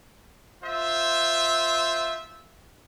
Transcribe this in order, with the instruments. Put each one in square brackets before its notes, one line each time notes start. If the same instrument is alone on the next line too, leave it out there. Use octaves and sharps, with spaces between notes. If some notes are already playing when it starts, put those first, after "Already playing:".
[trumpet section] F4 C5 E5